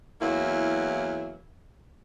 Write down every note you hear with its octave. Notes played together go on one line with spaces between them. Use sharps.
E2 F#3 A#3 E4